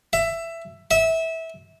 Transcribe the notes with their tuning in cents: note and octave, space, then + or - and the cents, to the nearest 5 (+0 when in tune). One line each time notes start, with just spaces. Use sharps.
E5 +15
E5 -20